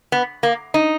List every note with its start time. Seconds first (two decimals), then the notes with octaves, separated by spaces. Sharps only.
0.12 B3
0.43 A#3
0.74 D#4